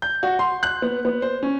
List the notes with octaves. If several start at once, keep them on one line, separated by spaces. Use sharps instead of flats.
G6
F#4
C6
F#6
B3
B3
C5
C#4